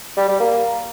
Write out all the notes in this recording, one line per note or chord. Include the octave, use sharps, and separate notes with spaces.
G3
G3
A#3